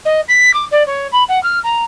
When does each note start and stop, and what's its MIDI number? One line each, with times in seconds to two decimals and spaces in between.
0.05 0.21 75
0.28 0.54 95
0.54 0.65 86
0.71 0.84 74
0.87 1.08 73
1.12 1.24 83
1.29 1.42 78
1.43 1.59 89
1.64 1.84 82